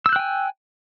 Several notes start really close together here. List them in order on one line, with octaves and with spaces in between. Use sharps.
E6 G6 F#6 G5 G#5